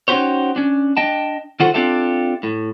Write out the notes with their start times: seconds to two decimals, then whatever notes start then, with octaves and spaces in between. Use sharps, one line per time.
0.08 C#4 D#4 F#4 G4 C5 C#5
0.56 C#4 D4
0.97 D4 D#5 G5 A5
1.60 D#3 F4 F#4 A4 C5
1.74 C4 D4 F4 G4 A4 E5
2.43 A2